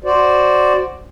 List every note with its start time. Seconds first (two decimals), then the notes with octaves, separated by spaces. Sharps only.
0.04 F#4 C5 D5